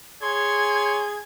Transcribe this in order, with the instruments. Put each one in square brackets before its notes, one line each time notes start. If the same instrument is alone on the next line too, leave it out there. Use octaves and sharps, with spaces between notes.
[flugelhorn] G#4 [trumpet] C#5 [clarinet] C6 [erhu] G#6